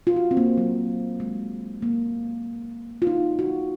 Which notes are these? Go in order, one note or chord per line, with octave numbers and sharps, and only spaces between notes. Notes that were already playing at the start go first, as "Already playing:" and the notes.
F4
F#4
C4
A#3
F#3
G#3
A#3
F4
D#4
F#4